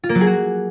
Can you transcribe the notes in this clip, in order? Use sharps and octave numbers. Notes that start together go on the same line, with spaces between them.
F4
A#3
F#3
G#4
F#4